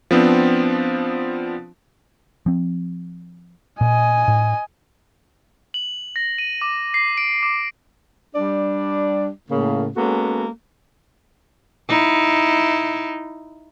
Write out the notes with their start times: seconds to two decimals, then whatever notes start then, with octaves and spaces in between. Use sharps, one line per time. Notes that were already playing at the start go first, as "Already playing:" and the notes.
0.11 F3 B3 C4 D4
2.46 F3 C4
3.81 A#2 D#5 G#5
4.28 A2
5.74 F#7
6.16 A#6
6.38 D#7
6.62 D6
6.94 C7
7.17 D7
7.43 D6
8.35 G3 D4 D5
9.50 A2 C#3 A#3
9.96 G#3 A#3 B3 C#4 F#4 A4
11.89 D#4 E4